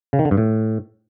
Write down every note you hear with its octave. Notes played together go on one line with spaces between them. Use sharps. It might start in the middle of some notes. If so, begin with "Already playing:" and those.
C#3
D#3
D3
G2
A2